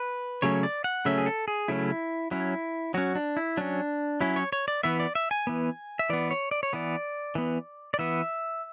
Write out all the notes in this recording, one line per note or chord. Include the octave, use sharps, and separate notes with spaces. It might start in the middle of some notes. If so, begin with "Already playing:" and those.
Already playing: B4
C#3 F#3 A3 C#4 C#5
D5
F#5
C#3 F#3 A3 C#4 E5
G#4
A4
G#4
C#3 F#3 A3 C#4 E4
F#3 C#4 E4
F#3 C#4 F#4
D4
E4
F#3 C#4 D4
F#3 C#4 E4
C#5
C#5
D5
E3 B3 E5
D5
E5
G#5
E3 B3
E5
E3 B3 D5
C#5
D5
C#5
E3 B3 D5
E3 B3
D5
E3 B3 E5